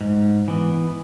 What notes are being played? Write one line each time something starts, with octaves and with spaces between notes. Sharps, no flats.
G#2
E3 B3